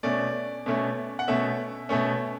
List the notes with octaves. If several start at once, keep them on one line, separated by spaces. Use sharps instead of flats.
B2 A3 C#4 D5
B2 A3 C#4
F#5
B2 A3 C#4 E5
B2 A3 C#4